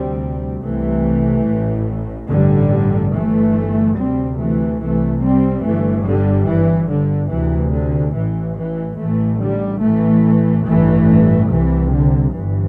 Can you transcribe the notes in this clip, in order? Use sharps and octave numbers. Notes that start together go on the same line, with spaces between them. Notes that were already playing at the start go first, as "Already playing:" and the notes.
Already playing: D2 C3 G3 C4
C2 C3 E3 A3
A1 A2
A1 G2 D3 G3
G1 G2 E3 A3
D2 C3 G3 C4
E3 A3
C2 C3 E3 A3
G3 C4
G1 G2 E3 A3
D3 G3
G1 G2 E3
D3
D2 C3 E3
D3
A1 A2 E3
E3
A1 A2 E3 A3
D3 G3
A1 A2 E3 A3
A1 G2 E3 A3
C2 C3 E3
D3
G1 G2 E3